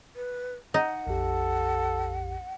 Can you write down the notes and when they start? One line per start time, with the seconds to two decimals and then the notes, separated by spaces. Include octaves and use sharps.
0.16 B4
0.74 D#4 F#5
1.07 A#1 F2 G4 A4